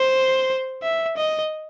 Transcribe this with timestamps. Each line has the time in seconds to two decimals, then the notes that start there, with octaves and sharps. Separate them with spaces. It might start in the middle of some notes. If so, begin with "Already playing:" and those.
Already playing: C5
0.83 E5
1.17 D#5